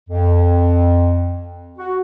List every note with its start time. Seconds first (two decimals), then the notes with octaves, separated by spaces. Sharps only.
0.09 F2
1.78 F#4